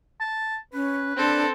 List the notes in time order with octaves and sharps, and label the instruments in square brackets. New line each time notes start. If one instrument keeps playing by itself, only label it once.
[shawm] A5
[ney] C#4 [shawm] B4
[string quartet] C4 A4 [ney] D4